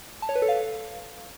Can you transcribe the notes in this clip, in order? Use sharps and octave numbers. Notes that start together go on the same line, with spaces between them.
A5
C#5
B4
A4
F5